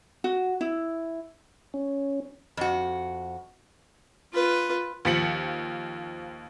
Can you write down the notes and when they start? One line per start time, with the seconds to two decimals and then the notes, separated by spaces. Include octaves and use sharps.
0.24 F#4
0.61 E4
1.74 C#4
2.57 F2 F#4
4.34 F4 B4
5.05 D#2 F3 A6 B6 C#7 F#7